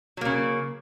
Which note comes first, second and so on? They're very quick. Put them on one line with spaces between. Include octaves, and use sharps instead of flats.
F#3 A#3 C#3